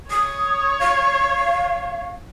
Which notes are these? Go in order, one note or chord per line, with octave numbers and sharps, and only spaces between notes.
C#5 D#6
F5